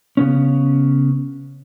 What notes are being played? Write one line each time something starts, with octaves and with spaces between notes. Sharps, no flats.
C#3 B3 C#4